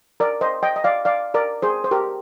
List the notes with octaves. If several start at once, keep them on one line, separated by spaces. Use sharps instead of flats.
A#4 D5
C5 D#5
D#5 G5
D#5
D5 F5
D5 F5
A#4 D5
G#4 C5
C5
G4 A#4